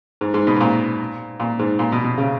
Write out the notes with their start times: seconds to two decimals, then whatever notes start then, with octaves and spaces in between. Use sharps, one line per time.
0.21 G#2
0.34 G#2
0.47 B2
0.56 G#2
0.61 A#2
1.40 A#2
1.59 G#2
1.79 A#2
1.92 B2
2.04 B2
2.18 C#3